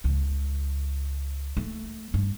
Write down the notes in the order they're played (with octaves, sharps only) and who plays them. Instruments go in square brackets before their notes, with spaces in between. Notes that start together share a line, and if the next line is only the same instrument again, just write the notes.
[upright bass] C#2
A3
G2